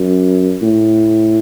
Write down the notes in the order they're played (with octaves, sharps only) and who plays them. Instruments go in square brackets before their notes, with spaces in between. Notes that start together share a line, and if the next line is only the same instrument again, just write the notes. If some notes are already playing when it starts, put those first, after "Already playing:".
Already playing: [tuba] F#2
A2